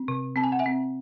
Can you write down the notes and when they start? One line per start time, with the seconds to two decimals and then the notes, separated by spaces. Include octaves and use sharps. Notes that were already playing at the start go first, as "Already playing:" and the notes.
Already playing: C4
0.08 C3
0.36 C4 A5
0.44 G#5
0.52 F#5
0.59 E5 G#5
0.66 C4